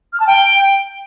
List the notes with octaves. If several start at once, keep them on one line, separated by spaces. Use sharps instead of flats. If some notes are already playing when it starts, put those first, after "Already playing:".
F6
A5
G5